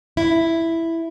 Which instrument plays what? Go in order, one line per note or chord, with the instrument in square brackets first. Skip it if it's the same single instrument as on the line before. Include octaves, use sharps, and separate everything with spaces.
[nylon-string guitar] E4